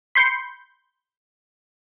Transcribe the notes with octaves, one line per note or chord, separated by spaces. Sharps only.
B5 C6 G6 C7 C#7